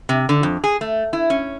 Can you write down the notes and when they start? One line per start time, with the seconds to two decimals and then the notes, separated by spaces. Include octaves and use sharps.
0.09 C3
0.29 D3
0.43 F2
0.64 G#4
0.81 A3
1.13 E4
1.30 C#4